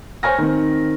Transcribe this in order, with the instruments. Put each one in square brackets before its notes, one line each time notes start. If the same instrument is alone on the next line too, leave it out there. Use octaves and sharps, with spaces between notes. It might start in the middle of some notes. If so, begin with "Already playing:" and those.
[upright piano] C5 C#5 G#5 F6 A#6
D#3 C4